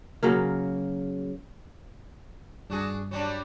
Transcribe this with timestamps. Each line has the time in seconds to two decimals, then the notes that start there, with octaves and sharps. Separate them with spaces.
0.23 C#3 F#3 A#3
2.70 G2 D4 F#4 G#4
3.11 F#3 G3 D4